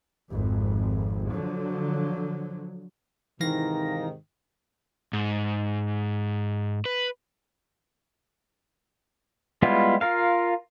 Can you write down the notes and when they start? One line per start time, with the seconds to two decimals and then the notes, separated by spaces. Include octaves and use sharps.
0.29 G#1 F2
1.28 D3 F3 F#3
3.40 G#2 C3 D#3 E3 D#4 F5 A#6
5.13 G#2
6.85 B4
9.62 G3 G#3 B3 E4 F4
10.01 F4 A#4 F5